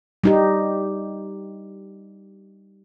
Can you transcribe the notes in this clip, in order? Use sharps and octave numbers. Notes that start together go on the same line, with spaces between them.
G3 D#4 G4